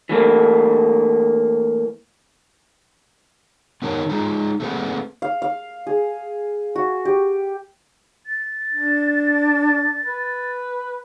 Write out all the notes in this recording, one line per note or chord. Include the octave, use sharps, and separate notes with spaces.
E3 A3 A#3
D#3 B3 D#4 A#4 C#5 A5
G#3 D#4 F4 G#4 A#5
A3 A#3 C4 G#4 B4 F#5
F5
F5
G#4
F#4
G4
A6
D4
B4